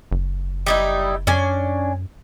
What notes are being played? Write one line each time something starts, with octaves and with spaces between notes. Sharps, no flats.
F#1
G3 D#4 E4
F#2 C#4 D4 G#5